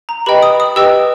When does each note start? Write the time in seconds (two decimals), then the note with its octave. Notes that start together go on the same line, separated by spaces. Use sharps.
0.09 A#5
0.26 G4 B4 D#5 G5 B5
0.42 D#6
0.60 D#6
0.76 G4 B4 D#5 G5 E6